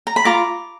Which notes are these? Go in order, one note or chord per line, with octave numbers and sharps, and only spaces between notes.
A#5
B5
F4 A#5 D6